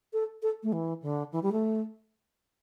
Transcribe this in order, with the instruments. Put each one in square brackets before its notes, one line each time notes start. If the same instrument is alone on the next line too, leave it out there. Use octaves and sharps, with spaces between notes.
[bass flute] A4
A4
A3
E3
D3
E3
G3
A3